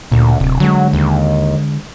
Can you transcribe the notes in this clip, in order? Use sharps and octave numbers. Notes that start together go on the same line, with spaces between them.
D2 A#2
D1 C3
D3 F#3 G#3
D#2